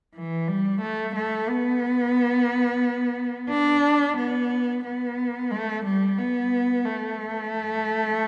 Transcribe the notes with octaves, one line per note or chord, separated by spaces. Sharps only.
E3
G3
A3
A3
B3
D4
B3
B3
A3
G3
B3
A3